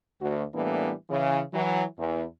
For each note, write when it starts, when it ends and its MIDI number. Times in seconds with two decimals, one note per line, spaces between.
0.21 0.42 38
0.21 0.42 66
0.54 0.92 45
0.54 0.92 52
0.54 0.92 55
0.54 0.92 58
0.54 0.92 59
0.54 0.92 62
1.10 1.42 49
1.10 1.42 52
1.53 1.84 52
1.53 1.84 54
1.98 2.24 40